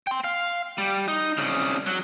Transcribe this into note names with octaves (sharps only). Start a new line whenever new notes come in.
G5 C6
F5
G3
D#4
C2 C#3
F#3